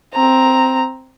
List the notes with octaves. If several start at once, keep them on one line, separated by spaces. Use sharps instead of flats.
C4 A#5